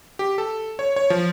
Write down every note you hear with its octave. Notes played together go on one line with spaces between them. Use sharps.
G4
A4
C#5
C#5
F3